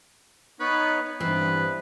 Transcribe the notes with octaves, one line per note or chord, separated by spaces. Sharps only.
B3 D#4 B4 C#5
G2 E3 B3 C4 B4